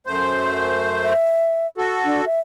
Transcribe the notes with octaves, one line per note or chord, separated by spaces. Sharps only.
F#2 A3 C5 C6
E5
F#4 A4
D4
E5